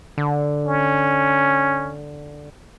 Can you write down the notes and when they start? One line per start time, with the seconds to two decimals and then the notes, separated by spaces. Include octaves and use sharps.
0.18 D3
0.66 C#4